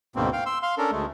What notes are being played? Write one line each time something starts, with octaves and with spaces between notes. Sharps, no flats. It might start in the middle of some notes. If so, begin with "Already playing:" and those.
D2 G#2 B2 A#3 C4
F5 G5
C6 E6
F5 C6
C#4 D4 A4 A#4
D2 G#3 A3